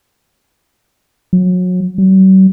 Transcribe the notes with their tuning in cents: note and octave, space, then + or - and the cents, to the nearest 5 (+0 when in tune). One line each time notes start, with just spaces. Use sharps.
F#3 -30
F#3 +45